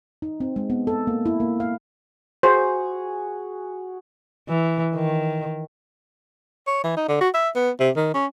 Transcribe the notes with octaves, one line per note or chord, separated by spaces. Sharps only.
D#4
C4
G#3
B3
A4
A#3
E4
A#3
F5
F#4 G#4 C5
E3
D#3
C#5
E3
D#4
D3
F#4
E5
B3
C3
D#3
C#4